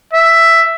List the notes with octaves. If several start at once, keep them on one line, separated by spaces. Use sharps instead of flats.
E5